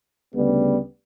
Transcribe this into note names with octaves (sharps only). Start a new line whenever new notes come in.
D2 C#3 G3 B3